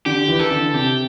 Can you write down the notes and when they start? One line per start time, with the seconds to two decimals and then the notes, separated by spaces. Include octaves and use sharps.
0.06 D3 G4
0.28 E3
0.39 A4
0.51 D3
0.74 C3 G4